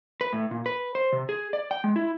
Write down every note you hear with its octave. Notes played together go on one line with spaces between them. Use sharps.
B4
A2
A#2
B4
C5
C3
G#4
D5
G5
G#3
E4